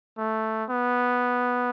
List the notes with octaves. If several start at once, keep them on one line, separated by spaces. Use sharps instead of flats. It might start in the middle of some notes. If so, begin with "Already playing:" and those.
A3
B3